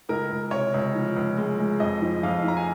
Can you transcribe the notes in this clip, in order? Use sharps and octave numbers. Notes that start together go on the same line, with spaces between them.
C#2 A#4
C#2
C3 C#5
C#2
F3
C#2
G#3
G#3
F2 D#5
F3
F2 F5
F3 A#5
G#5